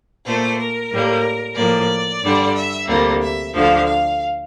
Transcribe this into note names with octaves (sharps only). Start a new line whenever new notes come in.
A#2 A3 C5
A#4
A2 G3 A#3
A2 F3 A#3 D5
G2 D3 G3
E5
D2 C3 G3 A#3
E5
D2 D3 F3 F5
F5